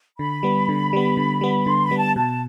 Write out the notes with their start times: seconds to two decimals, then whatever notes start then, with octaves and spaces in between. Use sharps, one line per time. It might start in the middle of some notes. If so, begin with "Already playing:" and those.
0.18 D3 B5
0.43 G3 B3
0.69 D3
0.93 G3 B3
1.17 D3
1.41 G3 B3
1.66 D3 C6
1.83 B5
1.91 G3 B3
1.98 A5
2.16 B2 A5